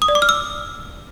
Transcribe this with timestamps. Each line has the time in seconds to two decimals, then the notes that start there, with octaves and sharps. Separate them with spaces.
0.02 D#6
0.08 D5
0.15 D6
0.22 F6
0.29 E6